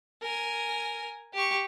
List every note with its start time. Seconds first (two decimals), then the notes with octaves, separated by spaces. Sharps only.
0.22 A#4 G#5
1.33 G4 C#6